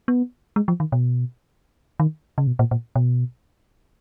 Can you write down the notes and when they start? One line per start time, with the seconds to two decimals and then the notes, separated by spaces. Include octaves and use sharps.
0.08 B3
0.56 G#3
0.68 F3
0.80 D#3
0.92 B2
2.00 D#3
2.38 C#3
2.47 B2
2.59 A#2
2.71 A#2
2.96 B2